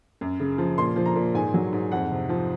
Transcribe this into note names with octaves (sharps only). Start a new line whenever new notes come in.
F#2
C#3
F3
A#2 C6
F3
A#5
A#2
G#2 G#5
F#3
G#2
F2 F#5
C3
F3